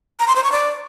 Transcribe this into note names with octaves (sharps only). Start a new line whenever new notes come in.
A#5
C6
C5
C#6
D5